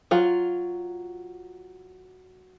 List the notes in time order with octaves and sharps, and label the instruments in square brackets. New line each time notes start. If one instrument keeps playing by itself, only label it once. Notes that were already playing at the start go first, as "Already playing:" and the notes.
[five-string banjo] F#3 F4